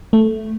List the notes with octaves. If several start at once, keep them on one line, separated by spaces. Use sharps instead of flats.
A3